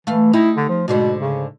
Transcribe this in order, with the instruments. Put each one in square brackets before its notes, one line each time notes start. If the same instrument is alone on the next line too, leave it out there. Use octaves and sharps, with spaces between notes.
[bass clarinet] E3 [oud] A3 F5
[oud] D#4 G4 [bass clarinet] E4
[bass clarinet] D3
F3
[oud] G#2 D3 C5 [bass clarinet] B2
[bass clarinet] C#3